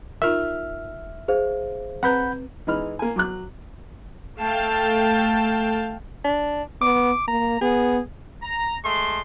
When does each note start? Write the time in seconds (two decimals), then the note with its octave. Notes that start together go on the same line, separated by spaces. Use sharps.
0.22 D#4 F4 A#4 E5 F6
1.28 G#4 C5 F5
2.03 C4 B4 F#5 A#5 B5 G6
2.67 E3 G#3 D#4 B5 F6
2.99 A#3 G#5
3.16 F#3 D6 F#6
4.39 A3 F5 G5 A5
6.24 D4
6.81 B3 D6
7.28 A#3 A#5
7.61 B3 G#4
8.42 A#5
8.83 G#3 A3 C6